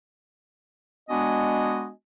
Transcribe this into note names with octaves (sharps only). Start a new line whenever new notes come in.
G#3 B3 D4 F#4 D#5 G#5